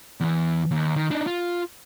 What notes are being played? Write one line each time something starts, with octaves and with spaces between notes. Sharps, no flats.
E2 E3
D#2
D#3
D4 D#4
F4